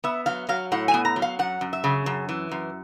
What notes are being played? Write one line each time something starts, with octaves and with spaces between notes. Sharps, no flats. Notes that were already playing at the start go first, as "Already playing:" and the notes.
B3 E5
F#3 F5
F#3 F5
A2 F#5
G#5
B3
A#5
F#3
F5
F#2 F#5
F#2
E5
C#3
F#2
E3
F#2